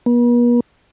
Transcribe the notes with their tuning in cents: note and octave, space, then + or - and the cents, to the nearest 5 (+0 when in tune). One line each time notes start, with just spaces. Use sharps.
B3 -45